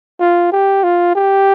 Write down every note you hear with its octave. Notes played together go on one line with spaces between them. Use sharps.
F4
G4
F4
G4